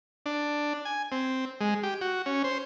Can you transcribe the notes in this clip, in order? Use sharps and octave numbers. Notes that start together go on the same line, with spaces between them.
D4
G#5
C4
G#3
G4
F#4
C#4
C5